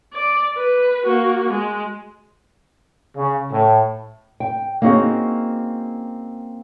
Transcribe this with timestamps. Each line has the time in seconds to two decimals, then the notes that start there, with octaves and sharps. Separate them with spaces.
0.13 D5
0.57 B4
1.05 A#3 F#4
1.50 G#3
3.16 C#3
3.50 A2
4.40 G5
4.82 A#3 C4 C#4 D#4 F#4 G#4